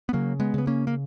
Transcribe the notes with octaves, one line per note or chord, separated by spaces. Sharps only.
B3
C#3 F#3 A#3
G#3 B3
C#3 B3
A#3 C#4
A#3